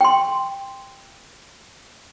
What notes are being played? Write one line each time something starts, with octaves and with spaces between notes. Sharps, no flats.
G5 C6